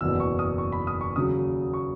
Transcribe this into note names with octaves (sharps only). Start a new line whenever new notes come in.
F#1 E2 B2 E6
C#6
D#6
C#6
B5
D#6
C#6
D#2 C#3 F#3 D#6
C#6